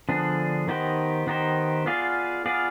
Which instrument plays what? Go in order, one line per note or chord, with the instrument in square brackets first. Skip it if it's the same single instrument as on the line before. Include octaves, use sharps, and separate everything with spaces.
[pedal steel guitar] D3 F3 B3 D4 G#4
D#3 B3 D#4 G4 C5
D#3 B3 D#4 G4 C5
B3 F4 G#4 D5 F5
B3 F4 G#4 D5 F5